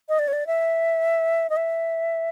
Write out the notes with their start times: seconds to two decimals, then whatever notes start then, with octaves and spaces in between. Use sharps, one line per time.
0.09 D#5
0.19 D5
0.28 C#5
0.33 D5
0.47 E5
1.50 D#5
1.57 E5